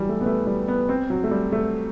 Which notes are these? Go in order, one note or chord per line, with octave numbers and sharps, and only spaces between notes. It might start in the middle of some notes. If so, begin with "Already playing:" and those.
Already playing: E3 F#3 G3
A3
B3
A3
G3
B3
C4
F#3
A3
G3
A3